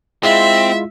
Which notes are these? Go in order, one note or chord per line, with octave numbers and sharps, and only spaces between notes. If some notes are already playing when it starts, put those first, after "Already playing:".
G#3 C4 E4 F4 E5